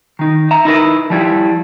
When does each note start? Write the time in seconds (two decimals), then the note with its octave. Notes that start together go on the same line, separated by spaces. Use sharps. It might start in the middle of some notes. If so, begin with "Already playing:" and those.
0.19 D#3 D#4
0.51 E5 A#5
0.65 D#4 E4 A#4 B4
1.10 F3 G3 E4